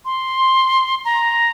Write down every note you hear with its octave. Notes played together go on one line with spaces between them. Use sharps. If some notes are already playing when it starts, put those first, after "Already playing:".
C6
A#5